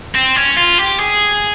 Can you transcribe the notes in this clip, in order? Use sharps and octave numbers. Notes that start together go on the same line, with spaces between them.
C4
C#4
F4
G4
G#4